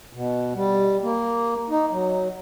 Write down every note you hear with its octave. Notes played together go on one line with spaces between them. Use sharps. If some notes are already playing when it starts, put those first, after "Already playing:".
B2
G3
A#3
D#4
F#3